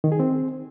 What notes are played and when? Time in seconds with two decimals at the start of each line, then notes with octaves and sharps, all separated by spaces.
0.04 D#3
0.12 G#4
0.20 C4